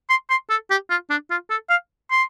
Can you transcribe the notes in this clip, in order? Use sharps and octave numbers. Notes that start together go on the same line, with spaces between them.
C6
C6
A4
G4
F4
D4
F4
A4
F5
C6